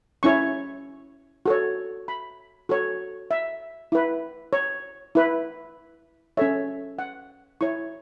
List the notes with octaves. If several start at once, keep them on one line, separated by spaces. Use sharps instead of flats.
C#4 E4 C#5 C#6
F#4 A4 C#5
B5
F#4 A4 C#5
E5
E4 B4
C#5
E4 B4
C#4 A4 C#5 E5
F#5
E4 C#5 C#6